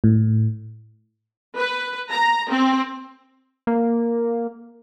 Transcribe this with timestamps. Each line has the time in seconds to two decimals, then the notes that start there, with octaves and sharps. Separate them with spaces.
0.04 A2
1.56 B4
2.10 A#5
2.49 C4
3.67 A#3